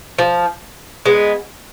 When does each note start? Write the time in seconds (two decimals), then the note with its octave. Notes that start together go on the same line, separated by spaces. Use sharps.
0.18 F3
1.06 G#3 B3